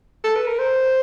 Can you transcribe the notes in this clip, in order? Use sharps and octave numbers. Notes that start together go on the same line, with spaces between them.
A4
B4
A#4
C5